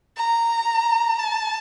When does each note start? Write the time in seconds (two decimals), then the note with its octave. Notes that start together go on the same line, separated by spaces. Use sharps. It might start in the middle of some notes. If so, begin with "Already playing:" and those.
0.17 A#5
1.19 A5